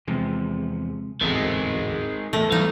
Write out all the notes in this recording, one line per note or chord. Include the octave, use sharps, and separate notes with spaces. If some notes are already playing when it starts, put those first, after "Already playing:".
E2 C3 F3 G#3
D1 G#1 E2 D#3 G#3 C4 A4 B4
E2 A2 A3
E3 F#3 G3 B3 D#4 F5